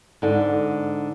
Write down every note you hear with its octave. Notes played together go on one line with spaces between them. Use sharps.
G#2 D3